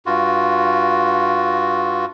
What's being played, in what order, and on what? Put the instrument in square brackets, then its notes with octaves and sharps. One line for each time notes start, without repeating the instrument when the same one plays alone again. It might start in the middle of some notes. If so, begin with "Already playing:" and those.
[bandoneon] G2 F4 F#4